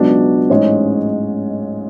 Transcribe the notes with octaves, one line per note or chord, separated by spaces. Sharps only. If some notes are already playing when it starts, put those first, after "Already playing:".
Already playing: C#2 B2 F#3 B3 D4
A1 G#2 G#3 C#4 C#5